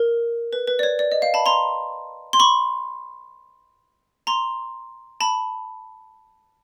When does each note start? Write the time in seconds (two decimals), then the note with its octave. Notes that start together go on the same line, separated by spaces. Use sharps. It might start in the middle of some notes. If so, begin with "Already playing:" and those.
Already playing: A#4
0.53 B4
0.67 B4
0.79 D5
0.83 C#5
0.99 D5
1.12 D#5
1.22 F5
1.34 A5 B5
1.46 A#5 C6
2.33 C6
2.40 B5 C#6
4.27 A#5 C6
5.21 A5 B5